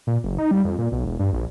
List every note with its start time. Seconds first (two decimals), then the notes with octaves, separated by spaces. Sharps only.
0.07 A#2
0.24 F#1
0.38 D#4
0.51 G3
0.65 F2
0.78 A#2
0.92 B1
1.05 E1
1.19 G2
1.33 A#1